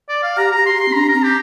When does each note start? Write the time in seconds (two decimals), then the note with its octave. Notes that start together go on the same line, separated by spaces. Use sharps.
0.09 D5
0.23 F5
0.37 G4 A#5
0.52 G4 A#5
0.66 C6
0.76 G4
0.81 C6
0.88 C4
0.94 D4 A#5
1.09 A#5
1.14 C4
1.23 G4